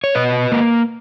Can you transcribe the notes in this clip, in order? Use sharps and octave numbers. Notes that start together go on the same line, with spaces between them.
C#5
B2 B4 D#5
A#3